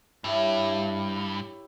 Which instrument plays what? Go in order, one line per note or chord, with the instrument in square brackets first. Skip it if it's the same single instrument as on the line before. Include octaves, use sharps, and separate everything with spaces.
[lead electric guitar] G2 [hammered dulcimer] E4 G4 C#5